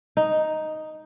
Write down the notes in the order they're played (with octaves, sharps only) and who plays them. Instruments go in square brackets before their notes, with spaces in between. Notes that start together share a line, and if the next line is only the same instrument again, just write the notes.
[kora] D#4